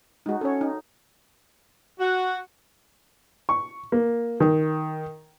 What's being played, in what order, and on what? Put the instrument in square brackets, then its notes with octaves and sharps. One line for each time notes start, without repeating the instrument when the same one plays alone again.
[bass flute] G#3 [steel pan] D#4 F#4
[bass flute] C#4 [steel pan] A4 C#5
[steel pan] D#4
[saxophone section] F#4
[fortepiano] C#6
A#3
D#3